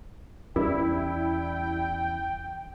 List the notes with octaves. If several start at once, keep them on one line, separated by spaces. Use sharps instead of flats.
E2 G3 C#4 E4 G5